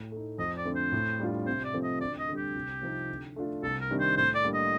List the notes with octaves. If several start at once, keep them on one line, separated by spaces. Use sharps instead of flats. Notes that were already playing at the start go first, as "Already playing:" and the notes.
Already playing: A2
A3 D#4
F2 D#5
D5
D3 A3 C4
C5
A2
G3 D4 F4
C3 C5
D5
F3 A3 C4
D#5
D2 D5
D#5
D3 G3
G4
C2
C3 F3 C4 D#4
D3
A3 D4 F4
C2 A4
A#4
C3 D#3 G3 D4
C5
A2 C5
D5
G3 A#3 D4
D#5